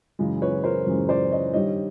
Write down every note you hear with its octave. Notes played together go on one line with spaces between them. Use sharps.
F#2 C#3 E3 G#3
B4 C#5
A#4 C5
F#2 C#3 E3 G#3
C5 D5
C#5 D#5
G2 D#3 G3 C#5 D#5